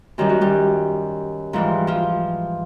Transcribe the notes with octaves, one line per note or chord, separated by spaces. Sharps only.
F#2 D#3 G3 G4
F#4
G3 G4
G#2 E3 F3 G3 F4
F3 F4